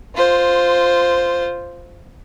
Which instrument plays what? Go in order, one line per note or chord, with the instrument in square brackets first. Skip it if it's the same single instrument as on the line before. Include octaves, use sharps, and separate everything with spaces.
[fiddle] F4 C5